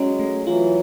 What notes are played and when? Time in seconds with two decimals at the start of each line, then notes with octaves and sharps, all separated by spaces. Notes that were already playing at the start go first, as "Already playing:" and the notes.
Already playing: F#3 G#3 C#4
0.20 A3
0.47 E3 F#3 F4